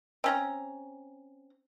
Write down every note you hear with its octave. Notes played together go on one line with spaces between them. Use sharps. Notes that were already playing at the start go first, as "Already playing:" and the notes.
C4 C#4 A#5